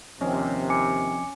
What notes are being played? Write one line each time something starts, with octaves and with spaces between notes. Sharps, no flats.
D#2 C3 F3 C4 C#4 D#5
G#5 D6 C#7